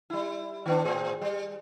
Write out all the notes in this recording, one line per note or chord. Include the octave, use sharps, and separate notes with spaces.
G3 E4
D#3 B3 D4
A2 C4 G#4
G3